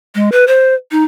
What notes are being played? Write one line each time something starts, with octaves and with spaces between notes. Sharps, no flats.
G#3
B4
C5
D#4